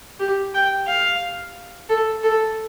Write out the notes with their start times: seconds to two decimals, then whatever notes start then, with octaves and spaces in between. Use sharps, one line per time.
0.20 G4
0.54 G5
0.87 F5
1.90 A4
2.24 A4